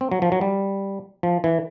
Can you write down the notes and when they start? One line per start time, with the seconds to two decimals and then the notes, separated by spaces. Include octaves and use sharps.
0.01 C4
0.12 F#3
0.22 F3
0.32 F#3
0.41 G3
1.23 F3
1.44 E3